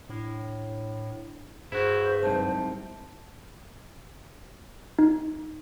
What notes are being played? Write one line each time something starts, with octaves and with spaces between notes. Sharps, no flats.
A2 D4 E4
G2 E4 F#4 G#4 C5
C2 G#2 C3 F#3 A5
D#4